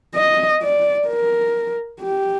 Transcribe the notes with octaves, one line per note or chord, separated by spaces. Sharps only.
D#5
D5
A#4
G4